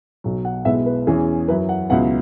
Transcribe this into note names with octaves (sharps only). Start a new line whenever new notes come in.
B1 B2 F#3
F#5
B1 B2 G#3 B3 E4 E5
B4
E2 E3 C#4 G#4
F#2 F#3 E4 B4
F#5
C#2 B2 F#3 B3 E4 F#5